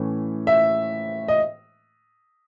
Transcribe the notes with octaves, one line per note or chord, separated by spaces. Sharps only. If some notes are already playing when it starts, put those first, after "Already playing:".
Already playing: A2 E3 A3 C#4
E5
D#5